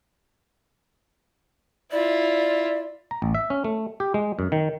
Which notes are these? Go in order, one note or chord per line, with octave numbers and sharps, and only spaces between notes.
E4 F4 D5
A#5
A1
E5
C#4
A3
G4
G#3
F#2
D#3